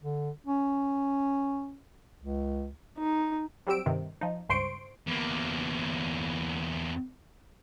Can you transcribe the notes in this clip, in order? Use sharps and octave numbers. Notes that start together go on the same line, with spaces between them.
D3
C#4
C#2
D#4
F#3 G3 C4 G4 E6 D7
G2 C3 D#3
F3 D#4
C#2 G2 C5 C6 C#6 D7
E2 A#3